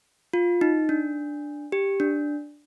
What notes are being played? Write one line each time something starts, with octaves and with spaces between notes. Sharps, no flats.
F4
D#4
D4
G4
D4